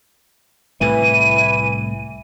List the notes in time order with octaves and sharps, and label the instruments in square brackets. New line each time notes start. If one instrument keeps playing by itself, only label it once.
[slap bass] C2 A2 A3 [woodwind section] E3 [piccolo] D#7